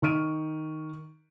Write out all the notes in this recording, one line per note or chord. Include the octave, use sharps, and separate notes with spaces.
D#3 D#4 C#6 F6 D7 D#7